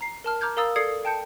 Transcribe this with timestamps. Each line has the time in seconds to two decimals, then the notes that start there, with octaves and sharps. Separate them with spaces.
0.01 A#5 C7
0.24 A#4 A5 F6
0.41 A#5 D6 F6 G6 G#6
0.57 A#4 F5 A#5 D#6 E6 A6
0.76 A4 D5 D#6 G#6 C7 C#7
1.05 G5 A5 G6 C#7